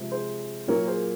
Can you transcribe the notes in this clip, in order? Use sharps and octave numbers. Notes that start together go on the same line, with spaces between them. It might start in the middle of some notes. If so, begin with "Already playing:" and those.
Already playing: C3 F3 G#3
G#4 C5
A#2 F#3 A#3 A#4 C#5
G#4 C5